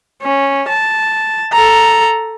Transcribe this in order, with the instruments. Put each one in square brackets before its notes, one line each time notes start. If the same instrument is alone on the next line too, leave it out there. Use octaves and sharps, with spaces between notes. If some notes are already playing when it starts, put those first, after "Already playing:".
[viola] C#4
A5
A4 A#5